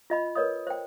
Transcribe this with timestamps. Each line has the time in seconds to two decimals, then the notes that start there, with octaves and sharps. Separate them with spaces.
0.10 F4 D#5 B5
0.35 A#4 B4 C#5 D#5 D#6
0.67 C5 G5